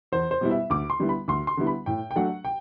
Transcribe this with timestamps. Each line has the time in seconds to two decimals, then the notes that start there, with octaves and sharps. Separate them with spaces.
0.12 E2 C5
0.31 C5
0.41 B2 G3 B3 E4
0.50 E5
0.70 D2 D6
0.90 C6
0.99 D3 G3 B3 E4
1.09 B5
1.28 D2 C6
1.47 C6
1.57 D3 G3 B3 E4
1.67 B5
1.86 A2 G5
2.11 G5
2.16 F#3 A3 D4 F#5
2.45 G5